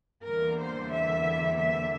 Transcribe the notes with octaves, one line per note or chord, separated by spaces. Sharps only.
E2 D3 G3 A#3 A#4
C5
E5
E5